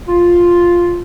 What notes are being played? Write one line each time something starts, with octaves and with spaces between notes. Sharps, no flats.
F4